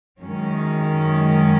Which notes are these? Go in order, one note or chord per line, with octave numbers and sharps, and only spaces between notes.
F#2 D#3 G#3 C#4